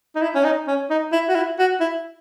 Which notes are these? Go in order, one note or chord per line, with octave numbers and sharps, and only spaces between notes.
D#4
E4
C#4
D#4
C#4
D#4
E4
F#4
E4
F#4
E4